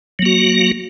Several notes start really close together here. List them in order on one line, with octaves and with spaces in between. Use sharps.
F#3 A#3 F#4